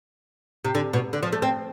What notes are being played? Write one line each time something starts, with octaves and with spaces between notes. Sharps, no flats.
C3
D3
B2
D3
F3
A3
C4